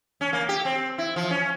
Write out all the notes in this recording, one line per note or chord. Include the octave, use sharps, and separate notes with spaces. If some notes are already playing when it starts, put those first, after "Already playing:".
C#4
A#3
G4
C4
E4
F3
C#4